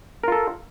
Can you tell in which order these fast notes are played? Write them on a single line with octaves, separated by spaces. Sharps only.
A#4 F4 A4